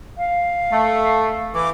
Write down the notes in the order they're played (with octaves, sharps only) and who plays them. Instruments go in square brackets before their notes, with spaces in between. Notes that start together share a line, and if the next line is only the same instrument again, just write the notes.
[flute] F5
[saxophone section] A3
[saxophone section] E3 [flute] D6